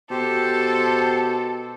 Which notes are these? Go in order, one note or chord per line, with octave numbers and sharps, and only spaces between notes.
B2 G4 A4 C5